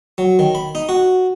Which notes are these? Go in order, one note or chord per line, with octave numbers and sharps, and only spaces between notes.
F#3
D#3
B5
D#4
F#4